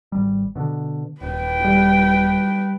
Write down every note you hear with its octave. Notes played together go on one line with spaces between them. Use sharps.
G#1 G3
B2 D3
D#1 B4 G5
G3